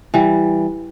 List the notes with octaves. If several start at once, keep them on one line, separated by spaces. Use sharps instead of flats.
E3 G3